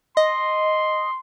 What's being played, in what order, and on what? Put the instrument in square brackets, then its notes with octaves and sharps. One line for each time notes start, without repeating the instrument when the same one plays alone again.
[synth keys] D#5 [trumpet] C6